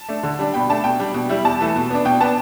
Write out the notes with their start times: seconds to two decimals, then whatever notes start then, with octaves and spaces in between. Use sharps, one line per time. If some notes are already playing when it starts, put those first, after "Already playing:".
Already playing: A5
0.09 A3 D4
0.23 D3
0.39 G3 D4
0.54 B2 G5 B5
0.69 A3 D4 A5
0.84 B2 G5
0.99 G3 D4
1.14 B2
1.29 G3 E4
1.44 E2 A5
1.61 E3 A3
1.76 B2
1.90 B3 D4
2.05 B2 G5
2.21 B3 D4 A5